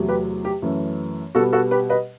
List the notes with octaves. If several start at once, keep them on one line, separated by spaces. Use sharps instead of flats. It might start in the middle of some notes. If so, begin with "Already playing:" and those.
Already playing: E2 C3 F#3 A3
G4 B4
G4
F#2 E3 A3
B2 G3 B3 F#4 A4
F#4 A4
G4 B4
B4 D#5